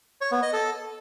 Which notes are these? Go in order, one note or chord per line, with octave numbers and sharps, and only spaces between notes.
C#5
B3
D#5
A4